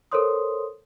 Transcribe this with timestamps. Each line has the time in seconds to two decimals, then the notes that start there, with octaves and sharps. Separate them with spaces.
0.11 A4 A#4 C5 C#5 C6 D#6